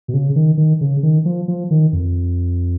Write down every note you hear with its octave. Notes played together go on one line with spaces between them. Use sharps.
B2
C#3
D#3
D#3
C#3
D#3
F3
F3
D#3
F2